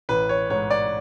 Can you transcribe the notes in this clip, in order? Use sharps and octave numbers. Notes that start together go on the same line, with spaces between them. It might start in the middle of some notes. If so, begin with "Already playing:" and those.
A1 B4
C#5
G#2 C#5
D5